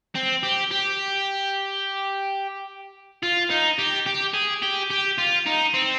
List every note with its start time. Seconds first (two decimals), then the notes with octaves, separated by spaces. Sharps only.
0.15 C4
0.43 G4
0.71 G4
3.23 F4
3.50 D#4
3.79 G4
4.06 G4
4.34 G#4
4.62 G4
4.90 G4
5.18 F4
5.46 D#4
5.74 C4